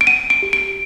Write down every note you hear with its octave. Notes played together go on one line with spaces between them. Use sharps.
D7
F#5 D#7
D7
G4
D7